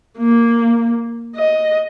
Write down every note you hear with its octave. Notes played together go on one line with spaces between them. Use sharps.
A#3
D#5